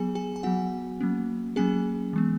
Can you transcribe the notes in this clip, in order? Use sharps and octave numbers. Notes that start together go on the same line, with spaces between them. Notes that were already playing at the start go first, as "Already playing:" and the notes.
Already playing: F#3 B3 G#4 G#5
G#4 G#5
G#5
F#3 B3 F#4 F#5
F#3 A#3 C#4
F#3 A#3 C#4 G#4 G#5
E3 G#3 B3